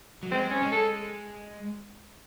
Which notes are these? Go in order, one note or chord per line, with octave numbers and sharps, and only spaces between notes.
F#3
G#3 C4
C#4
G#3
A4